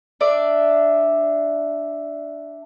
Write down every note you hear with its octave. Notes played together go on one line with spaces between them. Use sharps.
D4 D5 E5